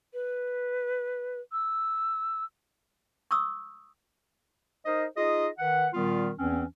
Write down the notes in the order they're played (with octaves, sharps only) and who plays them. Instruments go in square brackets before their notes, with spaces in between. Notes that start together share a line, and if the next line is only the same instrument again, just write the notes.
[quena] B4
E6
[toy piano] C#6 D#6 E6
[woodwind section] D#4 A#4 C5 D#5
D#4 F4 G#4 D#5
D#3 B4 F#5
A#2 D#3 G3 B3 F4
E2 E3 C4 C#4